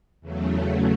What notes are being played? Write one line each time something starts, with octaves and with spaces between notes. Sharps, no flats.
E2 C#3 F#3 A3